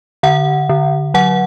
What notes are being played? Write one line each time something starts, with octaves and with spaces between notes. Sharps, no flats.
D3 F#5
D3
F#3 F#5